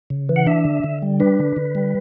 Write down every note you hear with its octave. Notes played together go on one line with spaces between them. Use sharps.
C#3
E3
F#5
D4 E5
D3
D3
G3
D4 B4
D3
D3
G3